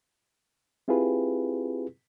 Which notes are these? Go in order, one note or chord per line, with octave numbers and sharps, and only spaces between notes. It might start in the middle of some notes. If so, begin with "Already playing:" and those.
C4 E4 F4 G4 G#4 B4